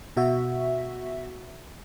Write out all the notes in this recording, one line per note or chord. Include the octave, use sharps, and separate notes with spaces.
B2 F#4 E5